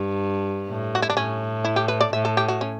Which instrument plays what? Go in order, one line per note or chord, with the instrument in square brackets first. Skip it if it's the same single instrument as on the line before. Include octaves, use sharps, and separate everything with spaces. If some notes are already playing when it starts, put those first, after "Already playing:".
Already playing: [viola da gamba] G2
A2
[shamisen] F#4
E4
D4
[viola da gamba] A2 [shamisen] C#4
[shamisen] E4
G4
B4
D5
[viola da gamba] A2 [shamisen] E5
[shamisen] A4
G4
F#4
C#4